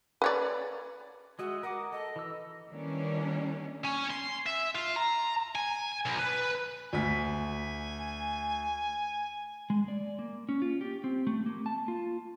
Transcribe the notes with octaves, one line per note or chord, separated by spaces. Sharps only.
B4 C#5 D5
G#3 F#4 D#5 E5
A#4 D#5 F#5 D6
A4 D#5
E3 E6
D#3 E3 G3 A#3 C#4 D4
C#4
C6
E5
F4
A#5
G#5
B1
B4
D2 G#5 B6
G#3
D5
A#3
C#4
F4
G4
C4
A3
A#3
A5
F4